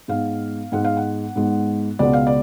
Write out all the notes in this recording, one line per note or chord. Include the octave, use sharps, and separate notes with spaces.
G#2 G#3 B3 F5
G#2 G#3 B3 F#5
F5
F#5
G#2 G#3 B3
C#2 B2 G#3 B3 D5
F5
D5